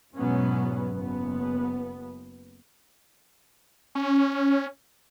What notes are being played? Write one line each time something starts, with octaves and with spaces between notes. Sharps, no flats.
E2 G#2 B2 F#3 B3 C#4
F#1 B3
C#4